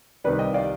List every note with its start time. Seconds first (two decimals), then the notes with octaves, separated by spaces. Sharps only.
0.24 C2 C3 D#3 G3 B4 D5
0.39 D#5 G5
0.53 D5 F5